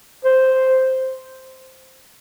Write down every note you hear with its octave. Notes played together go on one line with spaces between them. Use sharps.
C5